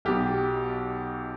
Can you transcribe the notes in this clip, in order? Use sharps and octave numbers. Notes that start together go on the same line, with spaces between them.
B1 B2 G4